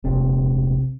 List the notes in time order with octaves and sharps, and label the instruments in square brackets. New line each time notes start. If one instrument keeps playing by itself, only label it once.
[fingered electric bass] E1 A#1 [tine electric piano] C3 C4